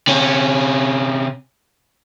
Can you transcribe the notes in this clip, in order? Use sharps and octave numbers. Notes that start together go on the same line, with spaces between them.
C3 C#4